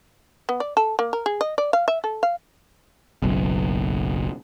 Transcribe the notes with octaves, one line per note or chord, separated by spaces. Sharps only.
B3
D5
A4
A#3
A#4
G#4
D#5
D5
F5
E5
A4
F5
F#1 B1